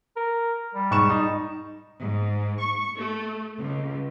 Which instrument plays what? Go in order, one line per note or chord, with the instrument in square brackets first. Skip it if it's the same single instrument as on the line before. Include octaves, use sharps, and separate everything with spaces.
[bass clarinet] A#4
G3
[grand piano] G#2 C#6 E7
D#4
[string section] G#2
C#6
A3
C#2